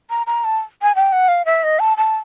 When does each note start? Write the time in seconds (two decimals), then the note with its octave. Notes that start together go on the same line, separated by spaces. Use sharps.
0.10 A#5
0.27 A#5
0.44 A5
0.82 G#5
0.95 G5
1.12 F#5
1.28 F5
1.45 E5
1.64 D#5
1.79 A5
1.97 A5